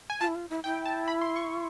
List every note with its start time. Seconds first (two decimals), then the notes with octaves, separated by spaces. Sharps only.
0.10 G#5
0.21 F4 A5
0.28 E4
0.36 F4
0.50 E4
0.64 E4 G5
0.86 A5
1.08 B5
1.21 C6
1.36 C#6